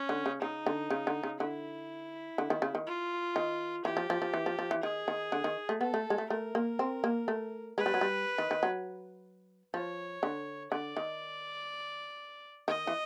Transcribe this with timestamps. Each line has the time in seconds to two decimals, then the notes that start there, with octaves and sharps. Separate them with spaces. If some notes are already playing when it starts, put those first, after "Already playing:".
Already playing: C#4
0.09 D3
0.26 C#3
0.42 C#3 D#4
0.66 D3
0.91 C#3
1.07 D3
1.23 C#3
1.40 D3 E4
2.38 D3
2.50 D#3
2.62 C#3
2.75 D#3
2.87 F4
3.36 D#3
3.85 E3 G4
3.97 F3
4.10 F3
4.22 F3
4.34 E3
4.46 F3
4.59 F3
4.71 E3
4.83 D#3 G#4
5.08 D#3
5.32 D3
5.44 D#3
5.69 A3
5.81 B3 A4
5.94 A3
6.10 G#3
6.18 A3
6.30 A3 A#4
6.55 A#3
6.79 C4
7.04 A#3
7.28 A3
7.78 G#3 B4
7.86 G3
7.94 F#3
8.01 G3
8.38 D#3
8.51 D#3
8.63 F#3
9.74 F3 C#5
10.23 D3
10.72 D3 D5
10.97 D#3
12.68 D#3 D#5
12.87 E3